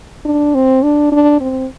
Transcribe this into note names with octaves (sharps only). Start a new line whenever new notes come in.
D4
C4
D4
D4
C4